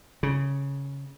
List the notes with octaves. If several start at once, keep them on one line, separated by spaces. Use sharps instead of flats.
C#3